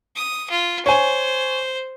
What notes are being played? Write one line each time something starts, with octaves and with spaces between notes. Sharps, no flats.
D#6
F4
C5 C#5 G#5